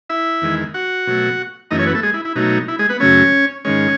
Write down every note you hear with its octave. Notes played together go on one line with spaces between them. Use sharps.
E4 E5
E2 D#3 G#3
F#4 F#5
B2 F#3 A3
F#2 E3 A3 D#4 D#5
C#4 C#5
B3 B4
A3 A4
G#3 G#4
E4
E4
B2 F#3 A3 D#4
E4
G#3 G#4
B3 B4
F#2 C#3 F#3 A3 C#4 C#5
G#2 D#3 G#3 C#4 C#5